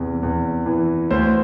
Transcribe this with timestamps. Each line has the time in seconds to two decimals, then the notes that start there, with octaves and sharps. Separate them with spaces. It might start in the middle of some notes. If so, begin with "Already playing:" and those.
Already playing: E2 C3
0.23 E2
0.66 E3
1.11 D2 C5